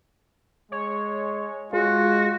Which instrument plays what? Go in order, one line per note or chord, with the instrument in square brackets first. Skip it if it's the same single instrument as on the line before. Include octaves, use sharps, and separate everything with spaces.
[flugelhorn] G#3 [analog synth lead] C#5
[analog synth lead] G#3 [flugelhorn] F4 [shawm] F#4